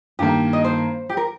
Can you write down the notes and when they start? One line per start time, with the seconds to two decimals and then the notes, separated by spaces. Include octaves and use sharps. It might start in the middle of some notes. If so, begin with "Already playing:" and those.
0.19 G2 D#3 A#3 G4
0.53 D#5
0.65 C5
1.09 G4
1.17 A#4